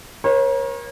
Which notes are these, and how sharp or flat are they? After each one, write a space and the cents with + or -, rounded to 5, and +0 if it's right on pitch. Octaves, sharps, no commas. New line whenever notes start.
A#4 +35 C#5 -35